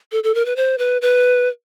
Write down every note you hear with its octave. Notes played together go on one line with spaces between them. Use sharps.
A4
A4
A#4
B4
C5
B4
B4